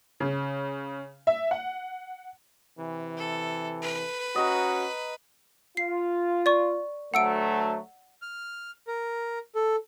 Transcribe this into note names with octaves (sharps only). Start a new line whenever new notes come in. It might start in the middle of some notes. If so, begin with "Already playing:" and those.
C#3
E5
F#5
C3 E3
A4
B4
C#4 F#4 D#5 A#5
F4 C7
D5 C#6
D2 F#3 A3 F#5 E6 D7
F6
A#4
A4